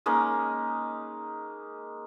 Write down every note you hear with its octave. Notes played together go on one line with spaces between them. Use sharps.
G#3 A#3 C#4 D#4